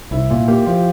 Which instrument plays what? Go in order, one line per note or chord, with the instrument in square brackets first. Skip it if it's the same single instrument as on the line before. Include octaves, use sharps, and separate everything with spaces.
[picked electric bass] C2 [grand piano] E4
[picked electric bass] A#2 [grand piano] F4
[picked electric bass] A#3 [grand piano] G4
[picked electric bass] F3 [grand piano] F4